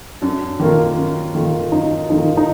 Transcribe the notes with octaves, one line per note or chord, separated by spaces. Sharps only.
F#2 D4
D#3 A#3 F4
F#2
D#3 A#3 F4
F#2 D#4
D#3 A#3 D#4 F4
D#4